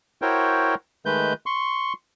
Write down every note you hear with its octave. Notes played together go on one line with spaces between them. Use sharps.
E4 F#4 A#4 C5 C#5 G5
D#3 G#3 A3 B4 G6
C6 C#6